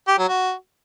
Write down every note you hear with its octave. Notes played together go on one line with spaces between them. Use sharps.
G4
F#3
F#4